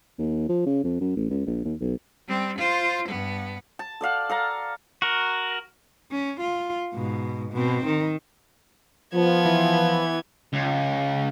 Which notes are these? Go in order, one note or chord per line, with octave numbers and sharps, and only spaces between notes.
D#2
F3
C#3
F2
F#2
A1
C#2
A#1
D#2
B1
G3 C4
F4 C5
G2 B3
A5
A4 D5 F5 F#5
A4 F5 A#5
F#4 A#4
C#4
F4
G#2 B2
B2 C4
D#3
F3 B3 G#6
E3
C#2